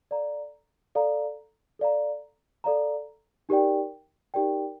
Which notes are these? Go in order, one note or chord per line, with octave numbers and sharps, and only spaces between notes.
A4 D5 F5 A#5
A4 D5 F5 A#5
A4 D5 F5 A#5
A4 D5 F5 A#5
D#4 G4 A#4 D5 G5
D#4 G4 A#4 D5 G5